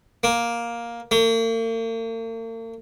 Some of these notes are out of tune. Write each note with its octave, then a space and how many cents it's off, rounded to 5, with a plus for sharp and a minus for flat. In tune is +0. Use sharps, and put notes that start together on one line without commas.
A#3 +10
A#3 -45